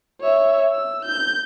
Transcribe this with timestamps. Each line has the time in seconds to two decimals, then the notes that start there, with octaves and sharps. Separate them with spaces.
0.21 C#5 E5
0.72 E6
1.05 G6